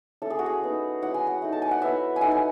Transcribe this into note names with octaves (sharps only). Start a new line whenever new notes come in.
A3 C#4 E4 A4
G#4
F#4
G#4
F#3 B3 D#4
F#3 C#4 E4 F#5
G#5
F#5
A3 D#4
A5
G#5
F#5
F#3 B3 E4 E5
G#5
A3 D#4 F#5
G#5